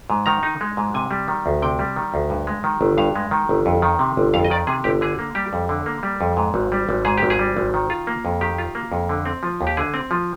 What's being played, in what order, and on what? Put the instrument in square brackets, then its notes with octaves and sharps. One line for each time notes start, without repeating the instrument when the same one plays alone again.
[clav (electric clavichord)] G#2
D#3 A#5
D#4
G#3
G#2
C3 G#5
G3
D#3
D2
C3 G5
G3
D#3
D2
G2
G#3
D#3
G1
G2 F5
G#3
D#3
G1
F2
D#3
C3
G1
F2 F5
D#5
D#3 D5
C3 G#4
G1 G4
D3 G#4
A#3
G3 G4
F2
D3
A#3
G3
F2
G#2
G#1
G3
G#1
G#2 G#4
G4
G#1
G#4
G3
G#1
D#3
F4
A#3
F2
D#3 G4
F4
A#3
F2
D3
C4
F3
D#2
G4
D3 G#4
C4
F3